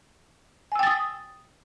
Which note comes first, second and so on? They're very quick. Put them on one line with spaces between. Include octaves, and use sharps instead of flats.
G#5 E6 G5 A6 D#6